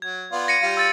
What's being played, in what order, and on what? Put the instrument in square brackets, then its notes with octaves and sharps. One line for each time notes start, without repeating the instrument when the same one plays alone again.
[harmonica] F#3 [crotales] G#6
[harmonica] B3 F4 D5
[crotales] A#6 C#7 D#7
[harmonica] G3 F4 F5
[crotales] E6 A6 D#7